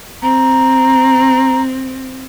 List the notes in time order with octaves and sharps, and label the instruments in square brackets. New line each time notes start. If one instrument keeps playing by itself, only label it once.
[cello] C4 [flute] A#5